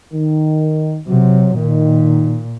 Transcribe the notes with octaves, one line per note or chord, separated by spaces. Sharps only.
D#3
C3 F#3
A#2 D#3